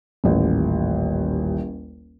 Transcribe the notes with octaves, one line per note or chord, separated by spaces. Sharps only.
D#1 A1